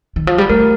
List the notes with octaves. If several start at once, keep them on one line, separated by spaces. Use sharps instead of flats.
D#3
F3
G3
A3 A#4